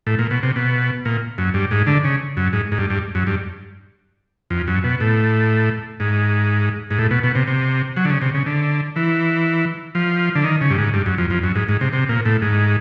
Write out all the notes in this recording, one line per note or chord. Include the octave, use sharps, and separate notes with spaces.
A2
A#2
B2
C3
B2
A#2
F#2
G2
G#2
D3
C#3
F#2
G#2
G#2
G2
G2
F#2
G2
F2
F#2
B2
A2
G#2
G#2
A2
B2
B2
C3
C3
F#3
D3
C#3
C3
C#3
D3
E3
F3
D3
D#3
C#3
G2
G#2
G2
F#2
F2
F2
F#2
G#2
G#2
C3
C3
A#2
A2
G#2